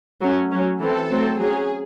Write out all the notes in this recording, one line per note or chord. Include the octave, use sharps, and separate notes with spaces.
F#3 A3 C#4
F#3 C#4
E3 C4 A4
F#3 A3 C4
F#3 C#4 G#4